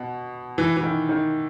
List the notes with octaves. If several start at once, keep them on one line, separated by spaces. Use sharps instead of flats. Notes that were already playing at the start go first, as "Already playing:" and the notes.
Already playing: B2
E3
E3
D#3
D#3